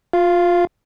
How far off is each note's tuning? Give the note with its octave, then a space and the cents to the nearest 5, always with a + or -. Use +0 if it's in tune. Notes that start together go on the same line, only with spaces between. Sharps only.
F4 +25 F5 -15